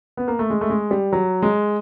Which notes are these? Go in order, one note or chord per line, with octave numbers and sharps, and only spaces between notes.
B3
A#3
A3
G#3
A3
G#3
G3
F#3
G#3